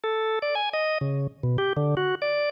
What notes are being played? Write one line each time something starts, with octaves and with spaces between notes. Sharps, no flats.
A4
D5
G#5
D#5
C#3
B2
G4
D3
F#4
D5